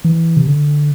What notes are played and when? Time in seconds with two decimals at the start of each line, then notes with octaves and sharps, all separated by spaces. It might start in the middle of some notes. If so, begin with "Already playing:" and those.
0.05 E3
0.37 C3
0.47 D3